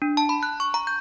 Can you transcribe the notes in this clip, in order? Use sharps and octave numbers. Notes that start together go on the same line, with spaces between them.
D4
A5
B5
F#6
C#6
A#5
G6